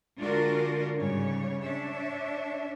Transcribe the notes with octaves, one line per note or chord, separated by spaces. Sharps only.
D3 G#3 D4 F4 F#4 A#4
G#2 C#3 G3 C#5
D4 C#5 E5